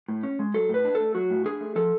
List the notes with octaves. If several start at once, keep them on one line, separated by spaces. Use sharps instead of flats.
A2
C#4
G#3
F#3 A4
A2 B4
D4
A3 A4
F#3 F#4
A2
D4 G#4
A3
F3 A4